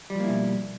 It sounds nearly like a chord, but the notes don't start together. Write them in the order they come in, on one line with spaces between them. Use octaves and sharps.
G3 F3 A#3 E4 B2